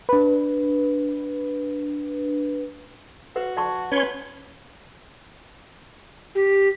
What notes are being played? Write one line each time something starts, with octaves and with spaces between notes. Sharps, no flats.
D4 B4
F#4 B4
D5 A5 C#6
C#4 B4 C#5 C6
G4